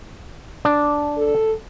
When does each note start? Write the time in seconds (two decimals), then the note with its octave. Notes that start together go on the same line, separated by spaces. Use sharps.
0.65 D4
1.17 A4